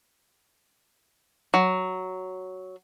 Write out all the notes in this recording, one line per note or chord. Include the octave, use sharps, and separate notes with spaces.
F#3